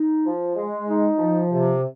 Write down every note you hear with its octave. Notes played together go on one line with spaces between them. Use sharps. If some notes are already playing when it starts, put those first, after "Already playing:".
Already playing: D#4
F3
G#3
D#4
F3
C3